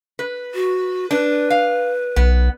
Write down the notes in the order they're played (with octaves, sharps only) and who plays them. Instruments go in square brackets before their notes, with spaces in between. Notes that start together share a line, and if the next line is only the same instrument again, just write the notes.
[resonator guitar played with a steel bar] B4
[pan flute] F#4
[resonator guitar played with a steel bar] D4 [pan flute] B4
[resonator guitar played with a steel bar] F5
[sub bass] B1 [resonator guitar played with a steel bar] B3